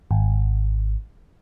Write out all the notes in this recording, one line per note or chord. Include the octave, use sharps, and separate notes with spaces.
G#1